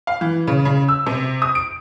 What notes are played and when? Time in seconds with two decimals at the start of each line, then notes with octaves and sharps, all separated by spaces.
0.07 F5
0.21 E3
0.47 C#3
0.65 C#3
0.88 E6
1.07 C3
1.42 D#6
1.55 D7